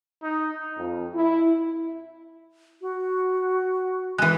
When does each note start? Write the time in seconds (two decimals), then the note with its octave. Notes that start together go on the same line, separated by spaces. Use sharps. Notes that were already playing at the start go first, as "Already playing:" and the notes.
0.23 D#4
0.77 F2
1.14 E4
2.81 F#4
4.18 E3 G#3 F#6